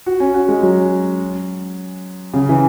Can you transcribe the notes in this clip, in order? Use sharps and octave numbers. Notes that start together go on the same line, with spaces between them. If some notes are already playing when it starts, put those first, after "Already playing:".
F#4
C#4
F#4
G#3
F#3
C#3
E3